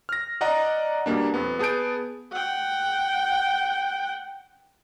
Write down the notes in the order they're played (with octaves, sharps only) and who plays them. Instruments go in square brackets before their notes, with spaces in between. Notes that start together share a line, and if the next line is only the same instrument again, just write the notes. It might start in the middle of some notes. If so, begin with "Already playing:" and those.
[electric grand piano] F6 A#6
D5 D#5 F#5 A#5
B2 G3 A#3 D4
F2 B3
B3 G#4 A5 G6 D7
[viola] F#5 G5